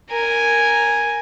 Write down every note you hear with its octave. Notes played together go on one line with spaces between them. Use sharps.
A#4 G#5